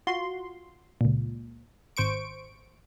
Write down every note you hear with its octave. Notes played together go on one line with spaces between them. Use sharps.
F4 F#4 C6
C#2 A#2
G#1 C5 C#6 D7